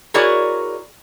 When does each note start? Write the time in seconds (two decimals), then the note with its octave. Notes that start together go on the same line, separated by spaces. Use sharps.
0.14 E4 F#4 G#4 A#4 C#5 D5